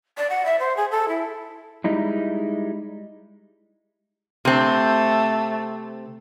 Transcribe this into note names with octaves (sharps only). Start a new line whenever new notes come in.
D5
F#5
E5
C5
G#4
A4
E4
G3 G#3 D#4 E4
C3 A3 C4